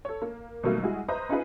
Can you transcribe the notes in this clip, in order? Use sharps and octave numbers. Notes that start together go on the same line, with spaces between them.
A4 C#5
A#3
B2 D#3 F#3 G3 A3 A#3
G3 G#3 E4 F#4 G#4
B4 C5 D#5 E5 A#5 D#6
C#4 D#4 F4 G#4 B4